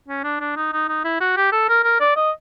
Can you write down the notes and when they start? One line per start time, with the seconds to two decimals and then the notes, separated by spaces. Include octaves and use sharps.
0.08 C#4
0.24 D4
0.40 D4
0.57 D#4
0.73 D#4
0.89 D#4
1.04 E4
1.21 F#4
1.37 G4
1.52 A4
1.69 A#4
1.84 A#4
2.01 D5
2.16 D#5